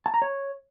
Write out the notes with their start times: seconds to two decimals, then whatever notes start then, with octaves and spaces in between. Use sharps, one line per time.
0.06 A5
0.14 A#5
0.22 C#5